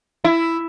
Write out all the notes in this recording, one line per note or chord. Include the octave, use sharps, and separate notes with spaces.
E4